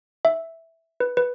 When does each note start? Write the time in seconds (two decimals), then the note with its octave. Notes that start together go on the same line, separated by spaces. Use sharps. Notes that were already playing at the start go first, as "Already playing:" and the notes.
0.25 E5
1.00 B4
1.17 B4